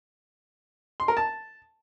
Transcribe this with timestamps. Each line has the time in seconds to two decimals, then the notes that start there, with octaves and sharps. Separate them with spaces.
1.00 C6
1.08 A#4
1.17 A5